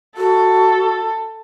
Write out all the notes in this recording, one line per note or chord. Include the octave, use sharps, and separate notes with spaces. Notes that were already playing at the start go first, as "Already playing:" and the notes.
F#4 A4